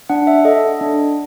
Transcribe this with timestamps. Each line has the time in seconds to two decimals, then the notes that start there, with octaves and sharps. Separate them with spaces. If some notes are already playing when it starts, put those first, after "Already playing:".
0.10 D4 F#5
0.27 E5
0.45 A4 D#5
0.81 D4